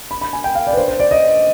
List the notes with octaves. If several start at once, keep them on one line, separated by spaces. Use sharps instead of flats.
B5
B5
G#5
G5
F5
D5
B4
C5
C5
D5
D#5